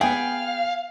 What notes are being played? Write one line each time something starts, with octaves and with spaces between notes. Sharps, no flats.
B3 G#4 F5 G5